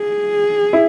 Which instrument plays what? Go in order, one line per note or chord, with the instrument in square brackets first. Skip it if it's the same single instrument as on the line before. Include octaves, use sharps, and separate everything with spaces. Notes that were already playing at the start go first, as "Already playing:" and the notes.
Already playing: [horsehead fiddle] G#4
[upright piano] E4